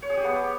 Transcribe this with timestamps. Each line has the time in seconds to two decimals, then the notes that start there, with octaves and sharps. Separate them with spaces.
0.02 C#5
0.10 G#4
0.17 G4
0.24 B3